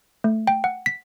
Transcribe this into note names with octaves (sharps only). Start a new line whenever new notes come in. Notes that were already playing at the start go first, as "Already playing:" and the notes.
A3
G5
F#5
B6